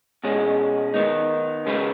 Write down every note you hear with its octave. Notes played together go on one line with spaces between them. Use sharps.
B2 G#3 C#4
D#3 B3 D#4
C#2 C#3 G#3 D#4 B4